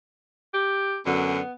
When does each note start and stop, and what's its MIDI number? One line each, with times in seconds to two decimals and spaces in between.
0.54 0.98 67
1.06 1.39 42
1.06 1.39 50
1.06 1.52 59